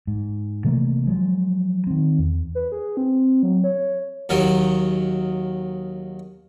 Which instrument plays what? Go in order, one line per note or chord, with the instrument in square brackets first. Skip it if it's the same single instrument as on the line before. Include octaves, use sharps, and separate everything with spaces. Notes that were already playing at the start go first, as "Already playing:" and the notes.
[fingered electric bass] G#2
C3 E3 A3 A#3
F3 F#3 G#3
D#3 C4
E2
[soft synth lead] B4
G#4
C4
F#3
C#5
[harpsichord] D#2 D#3 F#3